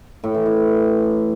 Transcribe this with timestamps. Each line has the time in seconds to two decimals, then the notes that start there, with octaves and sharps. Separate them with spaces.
0.24 A2
0.35 E3
0.46 E3